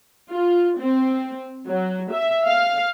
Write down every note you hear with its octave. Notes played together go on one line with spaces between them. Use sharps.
F4
C4
F#3
E5
F5